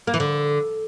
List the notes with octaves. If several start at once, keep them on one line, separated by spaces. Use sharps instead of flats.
A#3
E3
D3